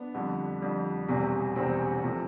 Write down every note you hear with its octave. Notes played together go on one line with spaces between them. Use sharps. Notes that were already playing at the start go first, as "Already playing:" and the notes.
Already playing: B3 D4
F2 D3 G3
F2 D3 G3
E1 E2 C3 G3
E1 E2 C3 G3 C4
C3 F3 A3